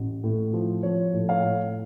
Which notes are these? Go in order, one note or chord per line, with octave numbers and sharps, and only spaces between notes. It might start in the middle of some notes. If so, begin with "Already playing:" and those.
Already playing: A1
A2
F3
F3 C#5
A2
C#5 F5
A2